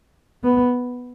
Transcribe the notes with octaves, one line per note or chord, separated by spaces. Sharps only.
B3